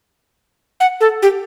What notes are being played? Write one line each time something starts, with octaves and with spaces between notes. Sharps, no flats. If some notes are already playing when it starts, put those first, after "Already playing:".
F#5
A4
G4